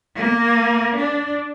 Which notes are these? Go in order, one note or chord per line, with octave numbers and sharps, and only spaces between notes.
A#3
D4